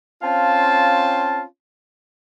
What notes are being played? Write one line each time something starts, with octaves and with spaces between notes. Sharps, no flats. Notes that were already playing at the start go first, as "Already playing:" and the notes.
C4 C#4 F4 F5 A5